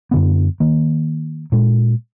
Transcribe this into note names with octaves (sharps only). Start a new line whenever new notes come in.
F#2 D3 B3
D#3 A#3
A#2 G#3